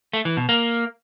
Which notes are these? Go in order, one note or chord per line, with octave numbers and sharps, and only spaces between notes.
A3
E3
B2
A#3